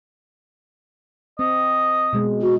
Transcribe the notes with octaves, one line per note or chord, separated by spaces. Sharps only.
C4 D#5
B2 G#3
F#4